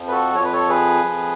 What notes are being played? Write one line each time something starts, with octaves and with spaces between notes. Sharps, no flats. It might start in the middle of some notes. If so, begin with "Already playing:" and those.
Already playing: F2 F3
B4
F#4 A4
F2 F3 C#5
B4
A4 C#5
G#4 B4
F2 F3